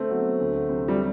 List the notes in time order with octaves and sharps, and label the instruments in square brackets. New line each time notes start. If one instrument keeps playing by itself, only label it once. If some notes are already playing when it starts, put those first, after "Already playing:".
Already playing: [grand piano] D3 [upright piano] A3 C4
[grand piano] F#3 B3 F#4
D2
C3 F#3 C4
[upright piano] G3